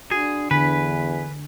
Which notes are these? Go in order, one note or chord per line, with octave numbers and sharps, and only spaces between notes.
D4 F#4 G#4
E2 D3 B4 G#5 B6